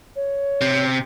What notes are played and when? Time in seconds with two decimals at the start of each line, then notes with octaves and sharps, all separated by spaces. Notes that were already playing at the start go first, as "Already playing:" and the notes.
0.16 C#5
0.61 C3